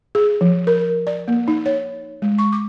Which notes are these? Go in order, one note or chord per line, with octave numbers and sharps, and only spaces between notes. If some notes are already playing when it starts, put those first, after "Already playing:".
G#4
F3
A#4
D5
A#3
D#4
C#5
G#3
C#6
D6